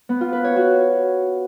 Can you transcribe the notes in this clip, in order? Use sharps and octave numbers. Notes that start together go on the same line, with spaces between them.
B3
F4
B4
C#5
F#4